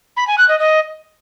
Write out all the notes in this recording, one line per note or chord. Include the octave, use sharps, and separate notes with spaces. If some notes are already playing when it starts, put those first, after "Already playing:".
B5
G#5
F#6
D#5
D#5